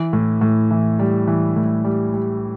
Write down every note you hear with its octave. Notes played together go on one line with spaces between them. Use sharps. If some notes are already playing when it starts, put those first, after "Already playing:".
Already playing: E3
A2
A2
E3
G3
E3
A2
G3
G3